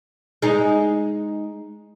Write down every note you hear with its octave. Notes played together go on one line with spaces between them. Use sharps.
G#3 D#4